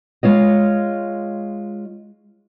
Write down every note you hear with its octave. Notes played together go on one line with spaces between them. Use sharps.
G#3 F4 C#5 D#5